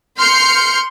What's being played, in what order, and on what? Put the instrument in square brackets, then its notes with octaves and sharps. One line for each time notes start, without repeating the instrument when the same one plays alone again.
[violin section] C6 F6 G6 C7 C#7